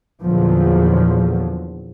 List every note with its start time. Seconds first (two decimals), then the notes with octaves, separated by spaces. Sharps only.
0.23 E2 A#2 D3 F3 F#3